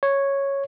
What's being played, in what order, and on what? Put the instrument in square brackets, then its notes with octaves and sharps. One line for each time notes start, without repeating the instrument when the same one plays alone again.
[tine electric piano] C#5